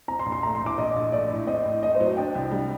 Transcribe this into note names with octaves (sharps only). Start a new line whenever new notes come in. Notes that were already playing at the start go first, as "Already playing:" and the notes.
C4 A#5
C6
A#1
C6
A3 A#5
C6
A2
D6
A#1 D#5
A#1
A3 D5
A2
C4 D#5
A2
A3 D#5
C5
F#3
D#5
D4 G5
C2
G3